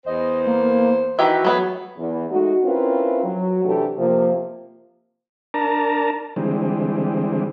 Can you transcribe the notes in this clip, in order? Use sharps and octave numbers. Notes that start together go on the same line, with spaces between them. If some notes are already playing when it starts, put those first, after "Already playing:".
E2 C5 D#5
A#3
D#3 E3 F#4 G4 B4 E5
F#3 A3 B3 G#4
E2
G#3 A3 D#4 F#4
C4 C#4 E4 F4 A#4 B4
F#3
C3 E3 A3 D4 G4 A4
C3 F3 A#3
D4 A#4 A5 A#5
D3 E3 G3 G#3 C4